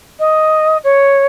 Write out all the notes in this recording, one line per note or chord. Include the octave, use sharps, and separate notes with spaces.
D#5
C#5